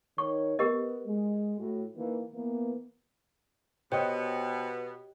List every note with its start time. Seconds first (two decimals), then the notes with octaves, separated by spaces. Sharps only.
0.18 D#3 C#5 C#6
0.59 B3 G4 A#4 D#5
1.06 G#3
1.59 A2 F#4
1.96 D#3 E3 A#3
2.34 E3 A#3 B3
3.92 B2 B3 G4 C5 C#5 D#5 G5